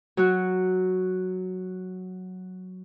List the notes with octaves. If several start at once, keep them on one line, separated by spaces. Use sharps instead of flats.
F#3 F#4